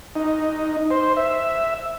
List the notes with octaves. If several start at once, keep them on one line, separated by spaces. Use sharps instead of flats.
D#4
C5
E5